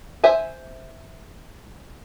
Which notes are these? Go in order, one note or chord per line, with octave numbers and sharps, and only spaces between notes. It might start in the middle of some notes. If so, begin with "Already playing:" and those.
C5 E5 G#5